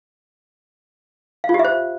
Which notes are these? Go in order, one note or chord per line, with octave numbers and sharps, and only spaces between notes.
F5
F4
G4
E5
C5